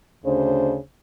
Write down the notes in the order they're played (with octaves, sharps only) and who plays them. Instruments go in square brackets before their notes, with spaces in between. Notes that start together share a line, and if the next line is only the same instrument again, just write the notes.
[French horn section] D2 C#3 D4 C5